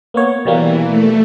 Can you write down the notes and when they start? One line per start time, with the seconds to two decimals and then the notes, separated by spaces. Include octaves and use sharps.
0.14 A#3 B3 C#5
0.45 B2 E3 G3 A#3
0.87 A3